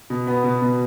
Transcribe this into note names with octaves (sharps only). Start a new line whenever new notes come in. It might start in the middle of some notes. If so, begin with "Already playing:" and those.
B2
B3
B2
B2